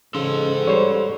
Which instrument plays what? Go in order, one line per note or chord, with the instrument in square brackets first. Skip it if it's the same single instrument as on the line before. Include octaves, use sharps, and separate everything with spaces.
[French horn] G#2 [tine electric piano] C#3 [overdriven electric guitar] A4 C6
[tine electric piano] G3 [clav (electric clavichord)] C5 C#5